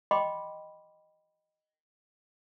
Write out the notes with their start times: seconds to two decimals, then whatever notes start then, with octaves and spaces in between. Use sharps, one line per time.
0.11 D#5 G5 B5 C6 D6